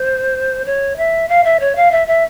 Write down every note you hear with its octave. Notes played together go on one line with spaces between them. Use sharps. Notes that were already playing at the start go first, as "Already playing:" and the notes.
Already playing: C5
C#5
E5
F5
E5
C#5
F5
E5
E5